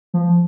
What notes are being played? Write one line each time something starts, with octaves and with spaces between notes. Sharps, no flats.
F3